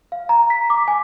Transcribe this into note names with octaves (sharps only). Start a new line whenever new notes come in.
F5
A#5
B6
D6
G#5